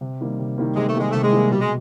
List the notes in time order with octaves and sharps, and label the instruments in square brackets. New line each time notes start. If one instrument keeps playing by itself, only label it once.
[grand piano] C3
D#3 G3 A#3
C3
D#3 G3 A#3
[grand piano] C3 [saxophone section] G#3
[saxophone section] A3
[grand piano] D#3 G3 A#3 [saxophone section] G#3
[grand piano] C3 [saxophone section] A3
[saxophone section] G#3
[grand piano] D#3 G3 A#3
[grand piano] B2 [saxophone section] G3
[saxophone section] G#3